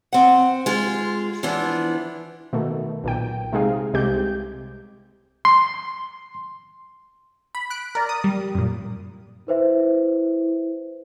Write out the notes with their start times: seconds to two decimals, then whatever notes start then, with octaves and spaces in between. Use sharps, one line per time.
0.13 C4 F#5
0.66 G#3 F4
1.43 E3 F3 B3 D4
2.53 B2 D#3 A3
3.04 B1 A#2 G5
3.53 C3 G#3 D#4 G#4 F5
3.94 C2 C3 G#3 G4 G6
5.45 C6
7.55 B5
7.70 F#6 D7
7.95 A#4 D5
8.09 D#6
8.24 G3
8.55 F#2 A#2
9.48 E4 B4 C5 E5